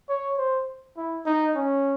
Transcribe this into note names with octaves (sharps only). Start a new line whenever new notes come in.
C#5
C5
E4
D#4
C#4